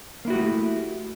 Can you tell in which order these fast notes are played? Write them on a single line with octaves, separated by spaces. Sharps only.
A#3 E4 F#4 G4 A3